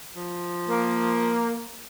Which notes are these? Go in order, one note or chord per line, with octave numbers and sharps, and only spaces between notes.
F3
A#3